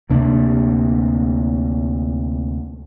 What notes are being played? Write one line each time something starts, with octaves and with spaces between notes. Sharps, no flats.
D2 C3 A#3 D4